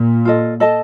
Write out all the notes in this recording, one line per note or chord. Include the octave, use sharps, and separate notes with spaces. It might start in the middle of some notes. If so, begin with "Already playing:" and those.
Already playing: A#2
F4 A4 D#5
A4 D#5 A5